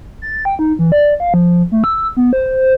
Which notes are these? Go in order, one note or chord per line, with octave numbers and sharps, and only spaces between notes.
A6
G5
D#4
E3
D5
F5
F3
A3
E6
B3
C5